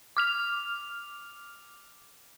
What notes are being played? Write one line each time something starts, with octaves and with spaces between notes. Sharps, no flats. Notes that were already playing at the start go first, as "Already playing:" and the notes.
D6 F6 F7